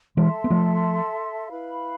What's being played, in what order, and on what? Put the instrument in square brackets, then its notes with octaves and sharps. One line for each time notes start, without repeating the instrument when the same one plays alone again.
[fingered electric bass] E3 G#3 [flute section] A4 E5 A5 C6
[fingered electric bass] B3
F3 A3
[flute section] E4 B4 F5 B5